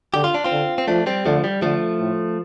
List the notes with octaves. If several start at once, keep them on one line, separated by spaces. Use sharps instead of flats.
D3 G4
F4
D4
C4 F4
D3
C4
F3 A3 D4
G3 C4
D3 F3 A3
G3
D3 F3 A3
A2